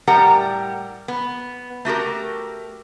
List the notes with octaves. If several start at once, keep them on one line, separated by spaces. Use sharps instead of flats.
A2 G3 G4 A#4 F#5 A#5
B3
A3 F#4 G4 A#4